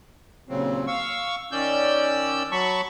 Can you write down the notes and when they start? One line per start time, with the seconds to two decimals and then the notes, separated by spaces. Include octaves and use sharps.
0.49 D#2 A#2 C#3 F#3 C4
0.87 F5 C#6 E6
1.52 D#3 C#4 D5 E6 G6
2.52 F#3 A5 B5 C#6